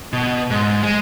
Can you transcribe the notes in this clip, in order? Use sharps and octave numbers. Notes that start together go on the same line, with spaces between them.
B2
G#2
G#3